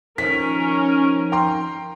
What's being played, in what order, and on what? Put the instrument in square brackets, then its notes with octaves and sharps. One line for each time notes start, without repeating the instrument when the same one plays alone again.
[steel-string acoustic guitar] D#3 [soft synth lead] F3 [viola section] C#4 A#4 [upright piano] B6
[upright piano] G5 A#5 C6